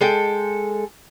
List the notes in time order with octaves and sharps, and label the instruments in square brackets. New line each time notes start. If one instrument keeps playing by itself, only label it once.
[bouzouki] G#3 A4 G5